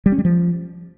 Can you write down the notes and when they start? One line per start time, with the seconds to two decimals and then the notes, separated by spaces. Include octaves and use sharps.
0.06 G3
0.12 C#4
0.18 G3
0.25 F3